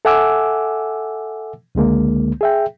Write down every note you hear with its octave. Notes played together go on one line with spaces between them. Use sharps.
A4 E5 F#5 G#5 D6 E6
C#2 D3 G#3 A#3
G#4 E5 G5